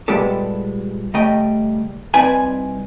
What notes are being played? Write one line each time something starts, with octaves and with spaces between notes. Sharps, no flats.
A#2 G3 G#3 B3 G4 A4
C#3 G3 A3 D#5 G5
C2 C4 D#4 B4 D5 G#5